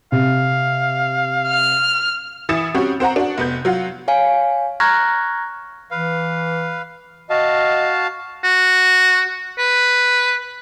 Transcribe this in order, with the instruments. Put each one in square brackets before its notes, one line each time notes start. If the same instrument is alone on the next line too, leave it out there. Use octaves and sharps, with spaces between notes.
[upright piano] C3 [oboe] F5
[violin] F6
[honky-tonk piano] E3 E4 D#6 A6 C#7 E7
G3 C4 C#4 F#4
C4 C5 F#5 A#5
D4 F#4 F#5
F1 B3 G6
F#3 F4 F#5
[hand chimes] C#5 F5 G#5
A#5 C#6 F6 F#6 G#6 A#6
[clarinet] E3 [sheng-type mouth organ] B4 F5
[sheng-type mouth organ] F#4 F5 A5 [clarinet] D#5
[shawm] F#4
B4